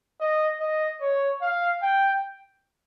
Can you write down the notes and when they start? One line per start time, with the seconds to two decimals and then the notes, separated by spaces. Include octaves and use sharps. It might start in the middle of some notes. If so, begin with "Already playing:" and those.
0.21 D#5
0.60 D#5
1.01 C#5
1.42 F5
1.82 G5